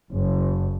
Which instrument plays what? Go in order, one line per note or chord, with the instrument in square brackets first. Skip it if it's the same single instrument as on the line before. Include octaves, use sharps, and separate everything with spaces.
[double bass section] F#1